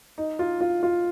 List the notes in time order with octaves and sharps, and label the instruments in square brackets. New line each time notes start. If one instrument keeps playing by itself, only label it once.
[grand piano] D#4
F4
F4
F4